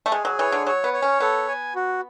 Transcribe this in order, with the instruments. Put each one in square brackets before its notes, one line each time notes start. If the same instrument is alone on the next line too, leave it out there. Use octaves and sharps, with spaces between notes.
[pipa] A3
[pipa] G#3 [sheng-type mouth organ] G#4
[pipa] F#3
[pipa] E3 [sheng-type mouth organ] C#5
[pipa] D3
[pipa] F#3 [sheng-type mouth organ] C#5
[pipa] B3
[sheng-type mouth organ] C#5
[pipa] C#4
[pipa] B3 [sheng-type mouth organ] A4
[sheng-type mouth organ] G#5
F#4